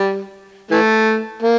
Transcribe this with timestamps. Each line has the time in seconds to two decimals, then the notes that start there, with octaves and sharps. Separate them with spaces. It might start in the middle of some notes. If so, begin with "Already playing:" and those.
Already playing: G3
0.71 E3 A3
1.43 A#3